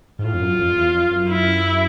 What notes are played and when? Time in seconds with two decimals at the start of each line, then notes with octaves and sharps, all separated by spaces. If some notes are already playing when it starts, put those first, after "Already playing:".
0.19 G#2
0.24 A2 F4
0.34 F2
0.41 F#2
0.59 F2
0.76 E2
0.94 F2
1.11 F#2
1.29 E4